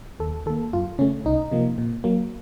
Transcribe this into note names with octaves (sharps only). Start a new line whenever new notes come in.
D#2 A4
D#3 A#3 A4
F#2 F4
C#3 A3 C#4
C2 D#4
C3 F3 A#3
A#2
F#3 A#3